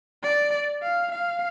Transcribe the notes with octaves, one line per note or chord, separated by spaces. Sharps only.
D5
F5
F5